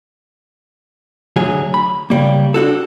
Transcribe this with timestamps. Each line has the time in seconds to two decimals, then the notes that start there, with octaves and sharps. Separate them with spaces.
1.36 D2 F#3 G#4 G#5
1.74 B5
2.10 C#3 G3 A#3
2.54 D4 D#4 F#4 A4